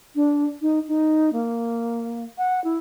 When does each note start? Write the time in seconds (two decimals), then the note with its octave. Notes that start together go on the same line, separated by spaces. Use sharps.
0.15 D4
0.62 D#4
0.88 D#4
1.33 A#3
2.38 F#5
2.64 E4